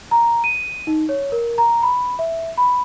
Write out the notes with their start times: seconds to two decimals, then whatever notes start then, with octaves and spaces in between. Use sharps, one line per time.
0.11 A#5
0.44 D#7
0.87 D#4
1.09 C#5
1.32 A#4
1.58 A#5
1.83 B5
2.19 E5
2.58 B5